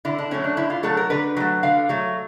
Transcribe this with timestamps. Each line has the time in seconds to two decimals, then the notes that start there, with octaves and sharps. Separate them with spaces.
0.05 D3 E4
0.19 D4
0.31 F#3 A3 C#4
0.44 D4
0.57 D3 E4
0.70 F4
0.83 F#3 A3 A4
0.97 A#4
1.10 D3 B4
1.37 F#3 A3
1.63 D3 F5
1.89 F#3 A3